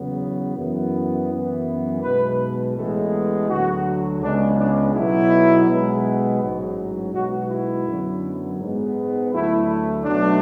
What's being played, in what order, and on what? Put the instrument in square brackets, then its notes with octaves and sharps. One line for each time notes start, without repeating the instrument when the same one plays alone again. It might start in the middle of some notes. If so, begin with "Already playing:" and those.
Already playing: [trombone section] E2 C#3 F#3 B3
F#2 E3 B3
F#2 E3 B3
B1 B2 G#3 B4
A1 A2 E3 G#3 B3 A4
D2 D3 F#3 F#4
C#2 C#3 G#3 B3 D4
D4
B1 B2 F#3 B3 E4
B1 B2 G#3 B3
A1 G#2 F#3
B1 B2 G#3 B3 F#4
E4
F#2 D3 F#3 B3
G#2 G#3 B3
D2 D3 F#3 A3 E4
B1 B2 F#3 A3 D4